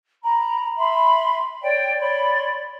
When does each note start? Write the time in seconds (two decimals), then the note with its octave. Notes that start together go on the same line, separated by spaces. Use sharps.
0.22 A#5 B5
0.76 E5 B5 C6
1.62 C#5 D5 G5
1.99 C#5 D5 B5 C6